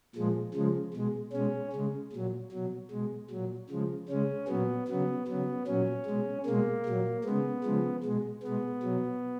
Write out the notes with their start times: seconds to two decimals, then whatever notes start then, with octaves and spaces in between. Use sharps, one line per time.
0.15 A#2 F3 G#3
0.54 C#3 F3 G#3
0.94 B2 G#3
1.32 B2 G#3 C#4
1.73 C#3 G#3
2.12 A#2 F#3
2.51 B2 F#3
2.91 B2 G#3
3.30 A#2 F#3
3.70 C#3 F3 G#3
4.09 C#3 G#3 C#4
4.48 A#2 F#3 B3
4.88 C#3 F#3 B3
5.28 C#3 F#3 B3
5.67 A#2 F#3 C#4
6.06 B2 G#3
6.46 B2 G#3 A#3
6.86 A#2 F#3
7.24 C#3 G#3 B3
7.64 C#3 F3 G#3
8.04 B2 G#3
8.43 B2 G#3 B3
8.83 B2 F#3